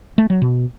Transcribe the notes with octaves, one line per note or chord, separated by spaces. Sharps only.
A3
F#3
B2